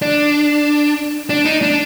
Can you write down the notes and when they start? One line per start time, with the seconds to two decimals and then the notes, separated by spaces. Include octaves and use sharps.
0.02 D4
1.29 D4
1.45 D#4
1.62 D4